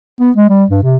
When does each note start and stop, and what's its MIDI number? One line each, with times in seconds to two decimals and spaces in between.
0.20 0.31 59
0.37 0.49 56
0.50 0.64 55
0.70 0.82 43
0.83 0.98 48